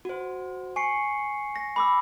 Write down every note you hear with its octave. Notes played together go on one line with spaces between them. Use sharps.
F#4 C5
G#5 C#6 C7 C#7
A#6
B5 D6 E6